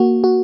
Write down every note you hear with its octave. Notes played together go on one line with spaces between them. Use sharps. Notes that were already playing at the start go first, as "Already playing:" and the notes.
Already playing: A#3 F#4
F#4